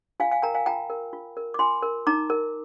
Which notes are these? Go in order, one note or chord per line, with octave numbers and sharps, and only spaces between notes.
F4 F5 G#5
F5 G#5
A#4 G5 A#5
F5 G#5
F4 G5 A#5
A#4
F4
A#4
D6
F4 G#5 C6
A#4
D#4 A#5 D6
A#4